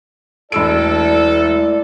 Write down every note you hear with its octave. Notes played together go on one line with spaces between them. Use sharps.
E1 A3 E4 A4 D5 E6 D7